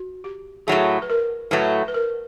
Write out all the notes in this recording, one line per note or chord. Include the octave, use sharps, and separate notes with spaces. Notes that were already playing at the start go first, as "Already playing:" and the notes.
Already playing: F#4
G4
A2 F#3 A3 G#4
B4
A#4
A2 F#3 A3 B4
B4
A#4